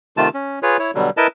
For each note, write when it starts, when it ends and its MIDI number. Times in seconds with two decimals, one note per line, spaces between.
0.17 0.29 48
0.17 0.29 51
0.17 0.29 57
0.17 0.29 65
0.17 0.29 81
0.34 0.59 61
0.63 0.77 65
0.63 0.77 68
0.63 0.77 71
0.63 0.77 73
0.79 0.91 64
0.79 0.91 73
0.95 1.10 47
0.95 1.10 50
0.95 1.10 54
0.95 1.10 55
1.17 1.27 64
1.17 1.27 70
1.17 1.27 71
1.17 1.27 75
1.17 1.27 81